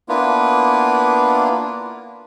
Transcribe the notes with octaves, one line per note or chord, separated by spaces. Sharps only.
A#3 B3 D4 E4 F4 B4